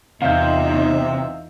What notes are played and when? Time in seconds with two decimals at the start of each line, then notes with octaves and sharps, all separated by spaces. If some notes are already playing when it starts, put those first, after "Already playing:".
0.22 E2 C3 D#4 F4 E5 F5 G6